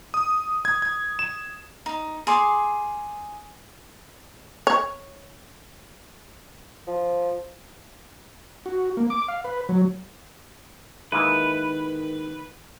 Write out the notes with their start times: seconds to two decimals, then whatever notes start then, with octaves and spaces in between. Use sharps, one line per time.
0.14 D#6
0.65 G#6
0.82 G#6
1.19 E7
1.86 D#4
2.27 G#4 C6 D6
4.67 C#5
6.87 F3
8.66 F#4
8.97 A#3
9.10 D6
9.28 F5
9.44 B4
9.69 F#3
11.12 D#3 G#3 A#3 E4 B4